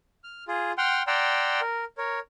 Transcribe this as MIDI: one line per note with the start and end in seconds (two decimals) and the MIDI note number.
0.24 0.44 89
0.48 0.72 65
0.48 0.72 68
0.78 1.03 78
0.78 1.03 79
0.78 1.03 84
0.78 1.03 89
1.07 1.61 74
1.07 1.61 78
1.07 1.61 79
1.07 1.61 82
1.07 1.61 84
1.07 1.61 88
1.61 1.85 70
1.98 2.19 70
1.98 2.19 73